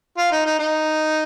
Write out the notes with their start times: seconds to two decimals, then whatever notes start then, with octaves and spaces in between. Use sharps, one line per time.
0.17 F4
0.32 D#4
0.46 D#4
0.59 D#4